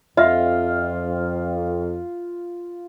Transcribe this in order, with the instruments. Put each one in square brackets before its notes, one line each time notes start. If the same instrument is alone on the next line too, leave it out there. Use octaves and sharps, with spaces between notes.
[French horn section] F2 [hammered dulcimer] F4 [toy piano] D#5 E5